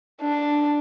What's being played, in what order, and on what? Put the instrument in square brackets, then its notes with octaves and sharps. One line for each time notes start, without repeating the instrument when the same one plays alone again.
[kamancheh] D4